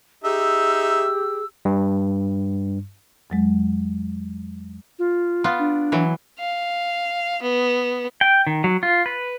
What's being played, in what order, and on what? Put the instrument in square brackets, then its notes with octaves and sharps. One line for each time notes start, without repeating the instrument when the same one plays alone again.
[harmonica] D#4 E5 [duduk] G4 [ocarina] G#4 [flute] E6
[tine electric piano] G2
[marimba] F2 F#3 G#3
[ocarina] F4
[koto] B3 F4
[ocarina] D4
[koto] E3 F#3
[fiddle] F5
B3
[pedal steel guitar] G5
D#3
F#3
F4
B4